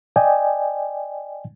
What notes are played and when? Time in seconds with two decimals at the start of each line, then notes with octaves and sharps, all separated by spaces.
0.16 D5 D#5 G5 G#5